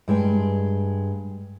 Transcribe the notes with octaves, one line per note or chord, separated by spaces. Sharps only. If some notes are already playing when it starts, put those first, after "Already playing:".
G2 G#3 G5